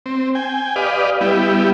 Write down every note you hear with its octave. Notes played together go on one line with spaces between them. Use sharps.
C4
G5 G#5
G4 B4 D5 D#5 F5
G3 B3 E4 G4